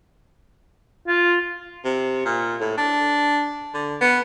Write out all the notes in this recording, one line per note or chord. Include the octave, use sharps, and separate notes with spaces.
F4
C3
A#2
A2
D4
D3
B3